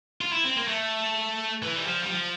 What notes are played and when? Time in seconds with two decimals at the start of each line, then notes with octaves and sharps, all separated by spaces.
0.21 F4
0.32 E4
0.44 C4
0.56 A#3
0.68 A3
1.63 E3
1.76 G3
1.86 F3
2.02 G3
2.09 F3